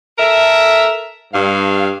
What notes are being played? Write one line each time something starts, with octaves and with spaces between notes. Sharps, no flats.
A4 A#4 E5
G2 F5